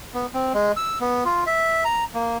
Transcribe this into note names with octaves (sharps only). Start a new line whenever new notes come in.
B3
C4
G#3
E6
B3
F4
E5
A#5
A#3